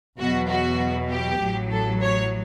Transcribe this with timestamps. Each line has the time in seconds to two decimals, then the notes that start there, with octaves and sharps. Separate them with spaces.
0.18 E2 B2 F#3 F#4
0.49 F#4
1.10 G4
1.40 A1 A2 F#3
1.71 A4
2.01 C#5